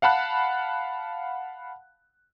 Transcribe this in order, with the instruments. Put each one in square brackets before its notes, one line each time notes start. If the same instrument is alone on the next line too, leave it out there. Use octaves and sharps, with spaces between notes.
[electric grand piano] F5 F#5 A5 B5 F#6